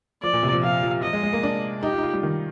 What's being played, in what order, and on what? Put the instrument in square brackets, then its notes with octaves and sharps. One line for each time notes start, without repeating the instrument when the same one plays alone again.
[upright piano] F3 [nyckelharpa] D5
[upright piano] A#2
C3
F3
[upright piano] F3 [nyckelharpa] F5
[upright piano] F3
[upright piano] F3 [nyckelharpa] D#5
[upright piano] G#3
G#3
A#3
D4
[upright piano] D#4 [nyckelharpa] G4
[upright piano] F4
D#4
F4
G3
D#3